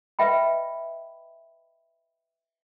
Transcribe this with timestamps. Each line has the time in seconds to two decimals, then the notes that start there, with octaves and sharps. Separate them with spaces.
0.19 B4 D#5 E5 G5 B5